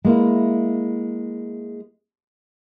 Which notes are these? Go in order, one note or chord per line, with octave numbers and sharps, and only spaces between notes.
G#3 A#3 E4